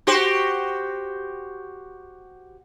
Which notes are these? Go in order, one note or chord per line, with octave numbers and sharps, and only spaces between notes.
F#4 G4 C5